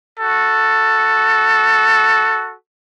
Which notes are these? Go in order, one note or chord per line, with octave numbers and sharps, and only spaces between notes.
F#4 A4